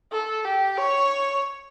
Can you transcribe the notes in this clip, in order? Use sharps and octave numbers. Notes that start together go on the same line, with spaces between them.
A4
G4
C#5